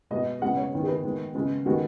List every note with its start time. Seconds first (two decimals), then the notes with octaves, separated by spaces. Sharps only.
0.11 B2 G#3 B3 D#5
0.42 C#3 G#3 B3 F#5
0.57 C#5
0.73 D#3 B3
0.83 G#4
0.88 B4
1.03 D#3 G#3 B3
1.35 C#3 G#3 B3
1.65 D#3 G#3 B3 F#4